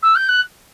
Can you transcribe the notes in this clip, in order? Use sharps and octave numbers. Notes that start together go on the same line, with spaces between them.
E6
G6
F#6